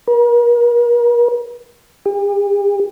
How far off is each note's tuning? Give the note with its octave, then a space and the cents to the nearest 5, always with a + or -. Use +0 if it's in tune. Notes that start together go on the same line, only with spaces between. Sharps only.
A#4 +40
G4 +45